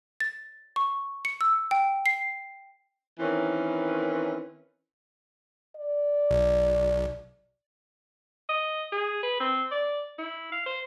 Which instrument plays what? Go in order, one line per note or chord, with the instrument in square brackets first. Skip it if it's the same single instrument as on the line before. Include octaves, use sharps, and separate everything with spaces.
[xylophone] A6
C#6
C#7
E6
G5
C7
[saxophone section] D#3 E3 C4 C#4 A#4 B4
[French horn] D5
[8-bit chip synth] B1
[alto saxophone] D#5
G#4
B4
C4
D5
E4
F5
C5